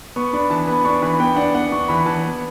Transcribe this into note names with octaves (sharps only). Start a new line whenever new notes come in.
B3 C#6
D4 B5
E3 A5
B3 B5
D4 C#6
E3 B5
B3 G5
D4 F#5
B3 F#5
D4 C#6
E3 B5
E3 A5
B3